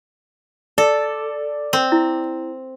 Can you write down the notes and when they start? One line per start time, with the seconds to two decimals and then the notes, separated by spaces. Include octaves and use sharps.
0.78 A4 D5
1.73 C4
1.92 E4